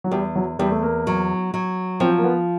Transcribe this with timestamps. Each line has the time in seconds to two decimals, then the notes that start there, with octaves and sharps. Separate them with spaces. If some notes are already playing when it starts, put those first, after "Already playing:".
0.04 F#3
0.11 E2 G3
0.35 F#3
0.59 E2 G3
0.71 A3
0.82 A#3
1.07 F#3
1.54 F#3
2.00 F3 C4
2.18 A#3
2.24 B3